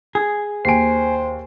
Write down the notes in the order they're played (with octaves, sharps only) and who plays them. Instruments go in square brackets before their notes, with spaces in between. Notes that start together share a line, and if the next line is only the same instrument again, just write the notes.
[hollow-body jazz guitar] G#4
[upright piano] D#2 D7 [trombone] C5 [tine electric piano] G#5 C7